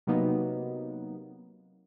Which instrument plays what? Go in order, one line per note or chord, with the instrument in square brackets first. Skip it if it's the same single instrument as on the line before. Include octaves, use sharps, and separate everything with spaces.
[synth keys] C3 F#3 A#3 B3 D#4